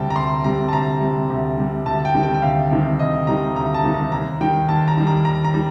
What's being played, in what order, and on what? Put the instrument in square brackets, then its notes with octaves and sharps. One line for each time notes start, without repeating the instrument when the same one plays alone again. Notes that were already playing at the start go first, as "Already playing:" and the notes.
Already playing: [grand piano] D2 C3 G3 G5 A5
A#5
D2 C6
C3 G3 A#5
A5
D2 A#5
C3 G3
D2
C3 G3
D2 A5
G5
C3 D#3 G3
G5
G5
D2 F5
C3 D#3 G3
D2 D#5
C3 D#3 G3 A#5
D2 A#5
A5
C3 D#3 G3
A#5
D#2 A#5
D#3 G3 G5
D#2 A5
A#5
D#3 G3
A#5
D#2 A#5
A#5
D#3 G3